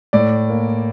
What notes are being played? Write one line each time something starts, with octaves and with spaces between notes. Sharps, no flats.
A2 D5
A#3